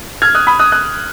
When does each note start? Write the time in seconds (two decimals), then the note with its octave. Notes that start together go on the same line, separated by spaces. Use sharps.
0.22 F6 G#6
0.35 D#6 F#6
0.47 B5 D#6
0.59 D#6 F#6
0.72 D#6 F#6